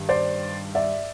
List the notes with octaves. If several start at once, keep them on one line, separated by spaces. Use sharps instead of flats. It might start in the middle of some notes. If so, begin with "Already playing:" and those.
Already playing: G2 D#3
C5 D5
D5 E5